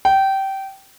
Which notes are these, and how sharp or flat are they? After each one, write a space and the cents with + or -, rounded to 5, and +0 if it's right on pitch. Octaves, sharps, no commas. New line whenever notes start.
G5 -20